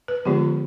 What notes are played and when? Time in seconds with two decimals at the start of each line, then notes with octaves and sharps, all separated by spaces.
0.08 B4
0.25 D3 F3 G#3 B3 F4 G4